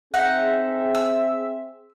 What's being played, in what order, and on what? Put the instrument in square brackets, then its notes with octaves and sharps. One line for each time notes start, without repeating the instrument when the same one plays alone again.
[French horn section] C4 G#4 [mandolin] D#4 F#5 [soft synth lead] E5
[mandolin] E6